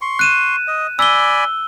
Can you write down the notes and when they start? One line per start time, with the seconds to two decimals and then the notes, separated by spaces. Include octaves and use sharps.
0.01 C6 C#6
0.19 F#6 D#7 E7
0.68 D#5
0.99 D5 G#5 B5 E6 G7